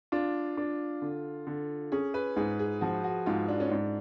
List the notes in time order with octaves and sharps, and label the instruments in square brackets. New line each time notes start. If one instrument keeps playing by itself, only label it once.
[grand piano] D4 [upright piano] F4
[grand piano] D4
D3
D3
[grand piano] C#4 [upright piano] G#4
[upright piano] B4
[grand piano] G#2 [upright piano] G#4
[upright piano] G#4
[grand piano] F3 [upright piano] F#4
[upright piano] F#4
[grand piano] G#2 [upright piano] F4
[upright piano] D4
C#4
[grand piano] G#2 [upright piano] D4